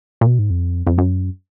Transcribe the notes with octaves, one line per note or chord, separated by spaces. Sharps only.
A#2
B2
G#2
F2
F2
F#2